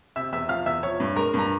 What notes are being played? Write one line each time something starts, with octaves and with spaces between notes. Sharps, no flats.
C3 E5 E6
E2 E5 E6
F3 F5 F6
E2 E5 E6
F3 C#5 C#6
G2
G#3 A#4 A#5
G2 A#5